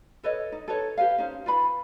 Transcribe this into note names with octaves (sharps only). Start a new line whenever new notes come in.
A4 B4 C#5 D#5
D#4
A4 B4 C#5
G4 B4 F5
C#4 D#4 C5
F4 B4 B5